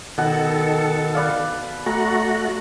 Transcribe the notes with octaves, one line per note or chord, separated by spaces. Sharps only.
B2 D#3 A4 F#5
B4 D5 F5
A3 F#4 A#5